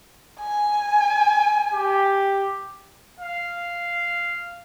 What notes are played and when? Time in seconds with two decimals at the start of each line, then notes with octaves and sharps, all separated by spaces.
0.40 G#5
1.74 G4
3.20 F5